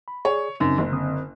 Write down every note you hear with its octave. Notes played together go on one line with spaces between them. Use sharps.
B5
G#4 C#5 D5
F#2 C#3 C4 D#4
F#1
D3 C4 D#6